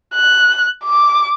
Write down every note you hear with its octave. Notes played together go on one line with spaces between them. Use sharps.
F#6
D6